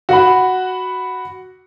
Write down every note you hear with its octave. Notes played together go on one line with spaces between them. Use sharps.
F#4 F#5 B5